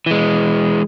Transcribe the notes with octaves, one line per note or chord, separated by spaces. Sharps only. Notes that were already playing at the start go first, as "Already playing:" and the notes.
E3 G#3